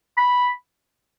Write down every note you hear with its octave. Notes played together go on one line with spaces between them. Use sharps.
B5